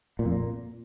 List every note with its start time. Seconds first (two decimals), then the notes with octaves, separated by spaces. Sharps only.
0.19 A#2
0.26 F2
0.32 A#2